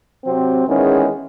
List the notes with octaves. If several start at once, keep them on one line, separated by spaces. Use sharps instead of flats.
C3 F#3 C4
E2 D#3 G#3 C#4